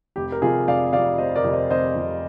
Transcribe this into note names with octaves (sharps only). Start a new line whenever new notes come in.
F1 G4
A#4
F2 C3 F4 G#4
F1 D5 F5
F2 C3 D5 F5
F1 C5 D#5
A#4 D5
F2 C3
C5 D#5
F1 C5 D#5
F2 C3